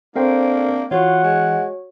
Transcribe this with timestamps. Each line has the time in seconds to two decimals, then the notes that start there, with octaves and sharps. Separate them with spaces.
0.16 A#3 C4 D4 A4 A#4 C5 F5 G5
0.91 E3 F4 F#4 C#5 F#5
1.24 G#3